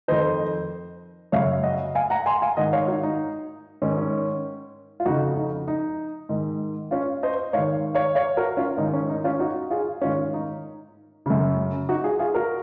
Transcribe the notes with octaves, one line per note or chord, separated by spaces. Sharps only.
F2 D#3 C5 D#5
F#2 C#3 C#5 F5
D#5 F#5
F5 G#5
F#5 A#5
G#5 C6
F5 G#5
G#2 D#3 D#5 F#5
C#5 F5
D#4 F#4
D#4
G#2 D#3 C#4
C#4
F4
F2 C#3 D#4 F#4
D#4
D#4
G#2 D#3
C#4 F4
C5 D#5
G#2 D#3 C#5 F5
C#5 F5
C#5 F5
F#4 A#4
C#4 F4
G#2 D#3 D#4
C#4
D#4
C#4 F4
D#4 F#4
F4 G#4
G#2 D#3 C#4 F4
D#4
F#2 C#3
D#4 F#4
F4 G#4
F4 G#4
F#4 A#4